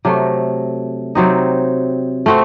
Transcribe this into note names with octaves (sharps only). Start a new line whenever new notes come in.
C3 F#3 A3
C3 F#3 C4 D#4
A3 C4 F#4